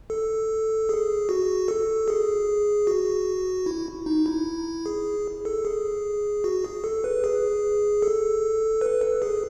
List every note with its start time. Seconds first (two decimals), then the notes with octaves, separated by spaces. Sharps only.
0.10 A4
0.89 G#4
1.29 F#4
1.68 A4
2.08 G#4
2.87 F#4
3.66 E4
4.06 D#4
4.26 E4
4.86 G#4
5.45 A4
5.65 G#4
6.44 F#4
6.64 G#4
6.84 A4
7.04 B4
7.24 G#4
8.02 A4
8.81 B4
9.01 A4
9.22 G#4